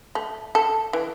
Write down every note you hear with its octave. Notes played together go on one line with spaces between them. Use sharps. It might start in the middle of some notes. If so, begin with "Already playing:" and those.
A3
A4
E3